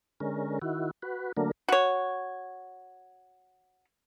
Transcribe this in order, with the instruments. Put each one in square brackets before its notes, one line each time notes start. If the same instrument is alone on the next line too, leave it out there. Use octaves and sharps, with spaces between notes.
[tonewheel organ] D3 G#3 C#4 A#4
D#3 E4 F#4
F#4 B4
D3 F#3 A3 A#3 D4 A#4
[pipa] F#4 C#5